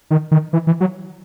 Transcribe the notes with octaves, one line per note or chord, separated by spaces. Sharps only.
D#3
D#3
E3
E3
F#3